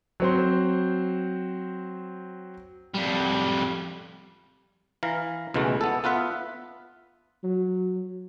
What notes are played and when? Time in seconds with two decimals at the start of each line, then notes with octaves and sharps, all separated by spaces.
0.20 F#3 C4 C5
2.95 F2 G3
5.03 E3 F5 A#5
5.54 C#2 B2 E3 G#3 A3
5.81 B3 A4
6.04 B3 F4 B4 E5
7.44 F#3